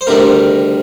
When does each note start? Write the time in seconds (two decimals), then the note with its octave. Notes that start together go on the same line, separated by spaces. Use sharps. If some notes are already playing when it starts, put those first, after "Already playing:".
0.01 C5
0.07 D2 C3 D#3 G3 A#4